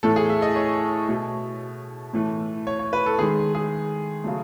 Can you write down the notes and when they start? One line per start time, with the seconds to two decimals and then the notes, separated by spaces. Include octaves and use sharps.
0.03 A2 E3 A3 A4
0.16 G#4
0.29 E5
0.42 D#5
0.56 C#5
1.08 B2 A3
2.13 A2 E3 A3
2.67 C#5
2.79 C#5
2.93 B4
3.06 A4
3.19 D#3 G#3 G#4
3.55 G#4
4.24 C#3 F#3 A3